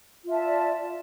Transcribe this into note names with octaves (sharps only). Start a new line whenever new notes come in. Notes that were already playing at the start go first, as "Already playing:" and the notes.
F4 D5 E5 A5